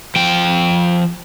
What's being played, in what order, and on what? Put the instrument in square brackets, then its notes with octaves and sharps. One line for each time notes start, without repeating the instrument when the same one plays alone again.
[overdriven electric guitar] F3 G5